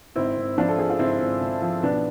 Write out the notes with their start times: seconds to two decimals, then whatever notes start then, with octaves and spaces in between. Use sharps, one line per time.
0.16 G#1 C4 E4
0.37 G#1
0.58 F3 D4 F4
0.69 A4
0.78 F3 G#4
0.90 F4
0.99 G#1 C4 E4
1.20 G#1
1.41 G#1
1.62 F3
1.83 B1 B3 D4